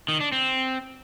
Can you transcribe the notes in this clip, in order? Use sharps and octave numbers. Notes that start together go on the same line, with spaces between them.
D#3
D4
C4